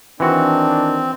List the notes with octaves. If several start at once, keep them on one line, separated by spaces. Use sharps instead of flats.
D#3 E3 C4 D4 F#4